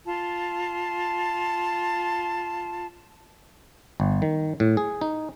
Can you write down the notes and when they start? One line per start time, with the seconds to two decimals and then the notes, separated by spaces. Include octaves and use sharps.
0.06 F4 A5 C6
4.00 G1
4.22 D#3
4.60 A2
4.77 G#4
5.01 D#4